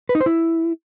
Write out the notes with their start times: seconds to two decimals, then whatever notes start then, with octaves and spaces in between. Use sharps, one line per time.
0.09 B4
0.15 D#4
0.21 C5
0.26 E4